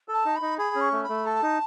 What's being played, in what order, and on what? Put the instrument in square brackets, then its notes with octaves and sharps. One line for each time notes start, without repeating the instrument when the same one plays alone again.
[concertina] A4
[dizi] A5
[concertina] D#4
[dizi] B5
[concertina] D#4
[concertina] G#4 [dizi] B5
[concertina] C#4
[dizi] C#6
[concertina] A3
[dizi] B5
[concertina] A3
[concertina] A4 [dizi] A5
[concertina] D#4